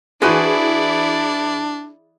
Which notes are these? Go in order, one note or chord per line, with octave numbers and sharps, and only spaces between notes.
E3 D4 E4 F#4 G#4 B4 C5 D5